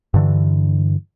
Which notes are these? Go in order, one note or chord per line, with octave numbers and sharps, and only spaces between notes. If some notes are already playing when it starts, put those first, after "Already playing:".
G2 D3 E3